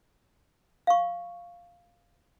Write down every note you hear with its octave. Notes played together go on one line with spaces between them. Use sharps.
F5 C#6